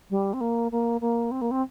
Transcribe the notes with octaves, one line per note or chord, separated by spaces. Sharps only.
G3
C4
A#3
A#3
A#3
C4
A#3
C4